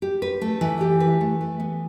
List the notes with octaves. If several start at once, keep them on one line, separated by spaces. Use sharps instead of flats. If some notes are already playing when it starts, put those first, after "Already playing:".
G4
B4
A3
E3
G4
B4
A3
E3
B3